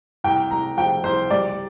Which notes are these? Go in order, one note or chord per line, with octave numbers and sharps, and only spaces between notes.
C2 G5
C2 A#5
F3 G5
C2 C5
G3 D5